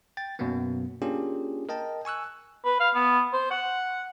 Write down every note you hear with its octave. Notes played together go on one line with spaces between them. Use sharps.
G5 A6
F#2 B2 F#3 A#3 B3
A#3 C#4 D4 F4 G4 G#4
A#4 D#5 G5 A5
G#5 C#6 E6 F#6
B4
F5
B3
C5
F#5